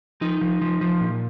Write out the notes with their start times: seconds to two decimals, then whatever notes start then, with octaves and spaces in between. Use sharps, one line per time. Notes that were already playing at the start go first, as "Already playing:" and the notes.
0.21 F3 D#4
0.41 F3
0.61 F3
0.81 F3
1.01 A#2